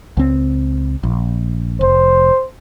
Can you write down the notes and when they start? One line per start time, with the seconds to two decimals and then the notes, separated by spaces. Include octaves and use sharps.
0.17 C#2 C4
1.03 A#1
1.81 F1 C5